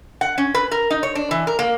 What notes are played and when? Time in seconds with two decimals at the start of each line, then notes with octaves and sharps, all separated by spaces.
0.21 F#5
0.38 C#4
0.55 B4
0.71 A#4
0.90 D#4
1.03 C#5
1.15 D4
1.31 E3
1.47 A#4
1.59 A#3